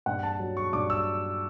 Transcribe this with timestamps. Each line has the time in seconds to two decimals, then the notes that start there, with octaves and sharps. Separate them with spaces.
0.06 G2 F#5
0.23 A5
0.40 F#3
0.57 C#6
0.72 G2 D6
0.90 E6